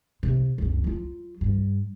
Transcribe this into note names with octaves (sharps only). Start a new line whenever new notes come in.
C3
C#2 F#2
F#3 F4
G2